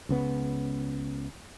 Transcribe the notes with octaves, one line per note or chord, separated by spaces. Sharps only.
C#2 C#3 B3